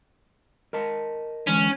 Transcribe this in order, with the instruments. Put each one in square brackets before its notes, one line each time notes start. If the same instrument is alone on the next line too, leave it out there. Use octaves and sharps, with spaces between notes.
[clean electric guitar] A#4 D#5 A5
[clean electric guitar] D3 E3 G#3 [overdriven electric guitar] C#4